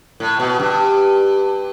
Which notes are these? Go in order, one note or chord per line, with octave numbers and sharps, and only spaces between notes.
A2
B2
G2